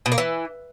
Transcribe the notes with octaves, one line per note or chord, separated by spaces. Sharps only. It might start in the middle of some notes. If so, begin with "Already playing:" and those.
B2
A#3
E3